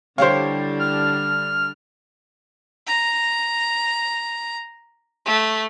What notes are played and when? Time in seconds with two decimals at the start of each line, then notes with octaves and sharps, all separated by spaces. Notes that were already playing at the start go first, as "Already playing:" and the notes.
0.18 D3 G3 D4 E4 G4 C5 C#5 F5
0.79 F6
2.87 A#5
5.26 A3